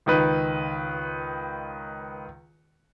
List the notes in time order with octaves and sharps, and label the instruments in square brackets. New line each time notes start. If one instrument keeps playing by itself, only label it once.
[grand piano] C#2 D#3 B4